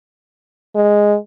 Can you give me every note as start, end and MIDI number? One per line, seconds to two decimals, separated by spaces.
0.75 1.16 56